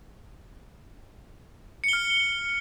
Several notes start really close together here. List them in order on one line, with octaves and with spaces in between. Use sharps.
C#7 G7 F6